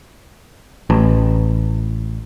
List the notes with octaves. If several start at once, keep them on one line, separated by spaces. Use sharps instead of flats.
A1